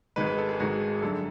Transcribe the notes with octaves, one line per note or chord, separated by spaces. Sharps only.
G#1 G#2 D#3 G#3 B4
B4
A4
G#4
G#1 G#2 D#3 G#3 F#4
F#2 D3 G3 A4